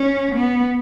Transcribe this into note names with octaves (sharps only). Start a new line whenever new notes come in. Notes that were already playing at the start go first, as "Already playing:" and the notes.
Already playing: C#4
B3